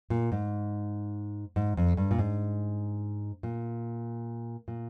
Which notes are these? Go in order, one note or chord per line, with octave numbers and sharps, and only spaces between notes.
A#2
G#2
G#2
F2
G2
A#2
G#2
A#2
A#2